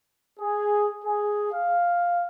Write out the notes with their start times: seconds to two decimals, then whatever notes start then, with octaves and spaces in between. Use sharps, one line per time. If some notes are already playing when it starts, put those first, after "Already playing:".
0.40 G#4
1.05 G#4
1.52 F5